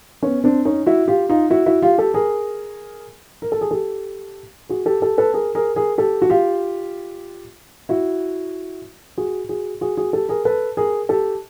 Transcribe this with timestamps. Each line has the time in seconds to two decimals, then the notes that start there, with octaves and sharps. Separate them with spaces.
0.23 B3 C#4
0.44 C4 D4
0.65 C#4 D#4
0.86 E4 F#4
1.08 F4 G4
1.29 D#4 F4
1.50 E4 F#4
1.66 E4 F#4
1.82 F4 G4
1.98 G4 A4
2.14 G#4 A#4
3.42 A#4
3.52 A4
3.61 G#4
3.71 G4 A4
4.69 F#4 G#4
4.86 G4 A4
5.02 G4 A4
5.18 A4 B4
5.34 G#4 A#4
5.55 G#4 A#4
5.76 G#4 A#4
5.98 G4 A4
6.22 F#4
6.30 F4 G4
7.89 E4 F#4
9.18 F#4 G#4
9.49 F#4 G#4
9.81 F#4 G#4
9.97 F#4 G#4
10.13 G4 A4
10.29 G#4 A#4
10.45 A4 B4
10.77 G#4 A#4
11.09 G4 A4